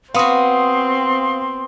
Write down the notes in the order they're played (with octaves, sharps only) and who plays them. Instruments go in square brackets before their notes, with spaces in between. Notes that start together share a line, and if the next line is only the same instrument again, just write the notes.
[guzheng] B3 F#4 [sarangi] C4 [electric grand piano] F5 D#6 [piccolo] C6